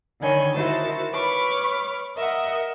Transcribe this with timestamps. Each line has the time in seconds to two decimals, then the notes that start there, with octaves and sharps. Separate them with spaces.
0.21 D3 D#3 C#5 G#5 B5 G6
0.54 D#4 E4 F#4 A#4 C5 A5
1.12 B4 C#5 B5 C#6 D6 F6
2.17 A#4 D#5 E5 F#5